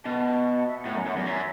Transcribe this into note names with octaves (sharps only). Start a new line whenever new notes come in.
B2 A5
A5
F#5
E5
F#5
A2
F#2
F#2
E2
F#2 E5